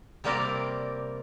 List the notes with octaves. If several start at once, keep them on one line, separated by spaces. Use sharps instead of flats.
C3 G3 A#3 C4 A#4 D5